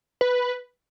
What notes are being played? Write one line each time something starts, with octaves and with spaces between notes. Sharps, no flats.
B4